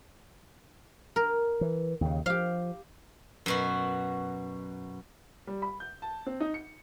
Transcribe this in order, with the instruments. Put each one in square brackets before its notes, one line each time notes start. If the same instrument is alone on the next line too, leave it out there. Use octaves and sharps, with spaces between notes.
[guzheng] A#4
[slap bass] E3
D#2 C#3
[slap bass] F3 [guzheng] G4 F5
[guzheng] F#2 B2 F#4
[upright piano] G3
B5
G6
A5
C4
D#4
C#7